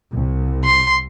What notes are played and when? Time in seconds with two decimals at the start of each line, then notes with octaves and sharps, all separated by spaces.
0.14 C2
0.64 C6